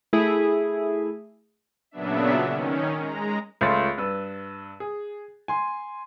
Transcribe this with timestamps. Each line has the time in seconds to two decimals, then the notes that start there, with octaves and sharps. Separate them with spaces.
0.13 A3 E4 G#4
1.91 A#2 C#3 F#3 B3 D4 E5
2.46 D#3 C#4
2.98 G#3 A#5
3.61 C#2 A3 F4 C#5 C6 A6
3.98 G2 B4 E6
4.80 G#4
5.48 G#5 C6